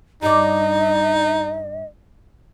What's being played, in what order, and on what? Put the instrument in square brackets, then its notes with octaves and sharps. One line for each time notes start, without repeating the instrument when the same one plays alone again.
[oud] G2 D5 [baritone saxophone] D#4 [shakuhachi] D#5